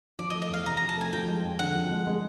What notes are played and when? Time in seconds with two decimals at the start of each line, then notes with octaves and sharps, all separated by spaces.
0.19 F3 D5
0.30 D#5
0.34 A3
0.42 D#5
0.49 E2 F5
0.66 C3 A#5
0.77 A#5
0.82 F3
0.89 A5
0.96 A3 G#5
1.13 F3 G5
1.28 G#3
1.44 F2
1.59 D3 F#5
1.75 F3
1.91 G#3
2.07 G#3